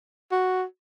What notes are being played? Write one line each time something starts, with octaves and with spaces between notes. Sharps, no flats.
F#4